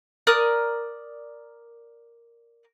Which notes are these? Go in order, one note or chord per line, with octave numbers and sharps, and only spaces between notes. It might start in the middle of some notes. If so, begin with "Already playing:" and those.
A#4 D5 D#6 F#6